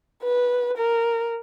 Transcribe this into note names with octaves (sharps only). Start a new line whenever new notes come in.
B4
A#4